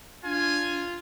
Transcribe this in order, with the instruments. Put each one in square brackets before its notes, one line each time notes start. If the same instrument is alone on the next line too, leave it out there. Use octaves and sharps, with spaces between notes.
[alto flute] D4 [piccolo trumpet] F4 [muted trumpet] G#5